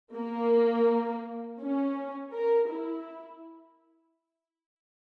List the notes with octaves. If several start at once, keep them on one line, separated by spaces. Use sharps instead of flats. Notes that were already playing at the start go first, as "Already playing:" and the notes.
A#3
C#4
A#4
E4